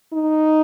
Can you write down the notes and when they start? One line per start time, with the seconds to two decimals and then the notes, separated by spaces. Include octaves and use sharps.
0.13 D#4